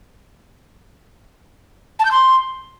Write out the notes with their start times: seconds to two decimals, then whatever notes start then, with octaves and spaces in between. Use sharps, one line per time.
1.99 A5
2.05 G6
2.11 C6